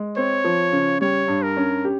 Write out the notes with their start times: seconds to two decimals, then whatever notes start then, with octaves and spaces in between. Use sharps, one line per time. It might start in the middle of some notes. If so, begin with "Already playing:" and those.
Already playing: G#3
0.17 C4 C#5
0.44 F3
0.72 C#3
1.01 G3 C#5
1.28 G2
1.43 A#4
1.57 C#4
1.85 G4